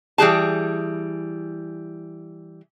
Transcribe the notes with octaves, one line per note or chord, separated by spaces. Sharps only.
E3 G3 G#4 A5